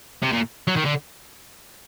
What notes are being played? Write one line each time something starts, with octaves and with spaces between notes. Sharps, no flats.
C3
A#2
F#3
D#3
D3